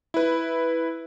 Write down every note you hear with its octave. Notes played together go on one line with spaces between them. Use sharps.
E4 B4